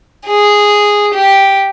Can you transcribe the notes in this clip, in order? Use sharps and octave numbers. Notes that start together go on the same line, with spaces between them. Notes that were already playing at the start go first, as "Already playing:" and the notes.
G#4
G4